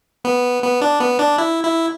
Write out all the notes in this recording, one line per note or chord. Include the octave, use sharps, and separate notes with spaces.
B3
B3
D4
B3
D4
E4
E4